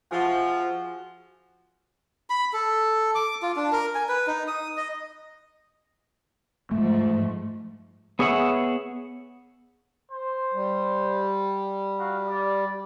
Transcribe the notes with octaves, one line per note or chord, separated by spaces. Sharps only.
F3 F#4 G#4 E5
B5
A4
D6
F4
D4
A#4
G#5
B4
D#4
D#6
D#5
G#2 F3 A3
B3 G#4 C#5 E5 F#5
C5
G3
D#4 F#4 F5
G4 D5